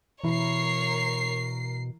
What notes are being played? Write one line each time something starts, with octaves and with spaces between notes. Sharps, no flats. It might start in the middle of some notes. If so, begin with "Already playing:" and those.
B2 E3 E4 A#4 C#5 C7